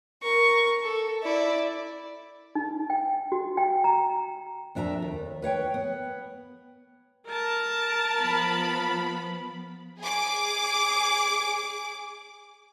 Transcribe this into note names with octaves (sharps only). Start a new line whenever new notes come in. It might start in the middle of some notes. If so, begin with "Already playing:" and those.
A#4 C#6
A4
E4 D5
D#4
G5
F#4
G5
A#5
F2 D4 E5 G#5 A#5
D#2
B4 C#5 F#5 G5
B3
A#4 A5
F3 B3 B5
G#4 D6